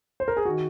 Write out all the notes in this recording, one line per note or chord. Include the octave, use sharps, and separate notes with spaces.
C5
A#4
G#4
D#3 F#4